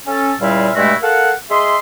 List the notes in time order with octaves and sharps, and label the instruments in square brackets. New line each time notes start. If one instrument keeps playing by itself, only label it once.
[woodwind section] C#4 A4
C#2 A#2 G3 E4 E5 F5
G2 A#2 G#3 A3 E4 F#4
A4 A#4 F5 F#5
G#3 G#4 E5 C6